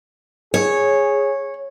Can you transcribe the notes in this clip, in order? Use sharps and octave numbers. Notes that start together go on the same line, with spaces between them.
G#4 C#5